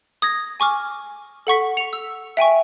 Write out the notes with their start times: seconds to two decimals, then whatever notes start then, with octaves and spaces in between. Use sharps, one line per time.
0.22 D#6 G#6 A#6
0.60 G#5 C#6 D6 F6
1.47 A4 F#5 C#6 B6
1.77 C#7 F7
1.93 E6
2.37 E5 G5 G#5 C#6